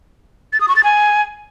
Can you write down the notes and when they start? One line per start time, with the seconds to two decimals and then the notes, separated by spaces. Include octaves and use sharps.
0.53 A6
0.61 D#6
0.68 C#6
0.76 A6
0.84 G#5